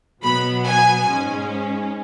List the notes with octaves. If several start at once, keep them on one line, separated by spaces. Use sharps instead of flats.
B2 F#3 B3 B5
G#5
G#2 G#3 C#4